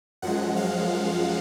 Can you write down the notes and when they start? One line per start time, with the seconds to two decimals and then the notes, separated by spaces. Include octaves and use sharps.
0.22 F#2 F3 G#3 F#5
0.56 F5